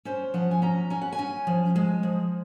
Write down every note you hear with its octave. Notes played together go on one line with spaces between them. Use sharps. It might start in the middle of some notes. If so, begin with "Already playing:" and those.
C#4 C5
F3 F#5
G#5
C#4 A#5
C#4 G#5
F#5
G#5
C#4
F3
G#3
F3